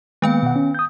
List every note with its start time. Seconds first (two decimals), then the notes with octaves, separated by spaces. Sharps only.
0.22 D#3 G#3 A#3 B3 F5
0.42 B2 F#5
0.56 C#4
0.75 D#6 G6